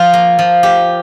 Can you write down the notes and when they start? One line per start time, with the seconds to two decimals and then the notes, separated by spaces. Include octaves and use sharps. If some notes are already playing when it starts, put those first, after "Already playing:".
Already playing: F3 F4
0.13 A#3
0.39 F3
0.63 G4